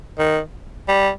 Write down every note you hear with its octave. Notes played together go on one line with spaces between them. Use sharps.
D#3
G3